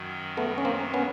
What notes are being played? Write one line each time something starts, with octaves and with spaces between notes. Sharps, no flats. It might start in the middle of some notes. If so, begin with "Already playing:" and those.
Already playing: F#2 D#3 F#3
A3 B3
C#4
A#3 C4
B3 C#4